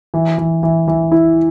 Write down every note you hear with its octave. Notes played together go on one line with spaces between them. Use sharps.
E3
E3
E3
E3
E4